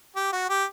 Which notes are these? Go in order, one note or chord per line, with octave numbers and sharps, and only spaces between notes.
G4
F#4
G4